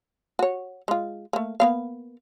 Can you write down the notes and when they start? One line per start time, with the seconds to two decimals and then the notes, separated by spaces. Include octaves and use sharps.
0.39 F#4 C#5
0.88 G#3 F4
1.33 A3 A#3
1.60 A#3 B3 F5